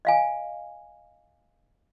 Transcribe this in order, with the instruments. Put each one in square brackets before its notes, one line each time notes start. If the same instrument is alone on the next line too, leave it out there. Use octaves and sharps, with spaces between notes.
[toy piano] D#5 F5 G#5